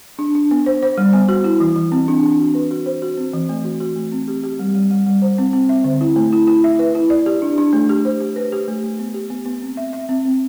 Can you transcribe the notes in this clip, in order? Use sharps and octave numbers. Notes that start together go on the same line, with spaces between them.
D4
D4
B3
C5
C5
G3
B3
F#4
E4
E3
E3
C4
D4
D4
F#4
B4
F#4
C5
F#4
C4
E3
A3
F#4
F#4
A3
C4
G4
G4
G3
G3
G3
G3
C5
C4
C4
E5
D3
E4
A3
E4
E4
E5
B4
E4
D5
G4
D4
D4
A3
G4
C5
G4
B4
G4
A3
A3
B3
G4
B3
B3
C4
E5
E5
C4
C4